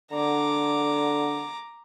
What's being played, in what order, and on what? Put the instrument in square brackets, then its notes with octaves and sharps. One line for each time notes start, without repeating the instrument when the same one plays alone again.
[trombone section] D3 [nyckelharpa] A#5 D6